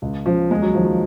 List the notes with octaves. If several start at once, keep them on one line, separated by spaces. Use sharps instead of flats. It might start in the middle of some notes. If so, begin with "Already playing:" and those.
C#2
C#3 F3
D#2 G#3
F#3
D#3 F3
F#3